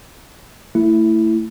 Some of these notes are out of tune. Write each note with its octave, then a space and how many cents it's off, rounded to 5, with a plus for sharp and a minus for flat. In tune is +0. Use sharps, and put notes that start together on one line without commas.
A3 +20 E4 +0